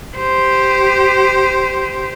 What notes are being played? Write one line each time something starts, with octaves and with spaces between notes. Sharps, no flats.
G4 C5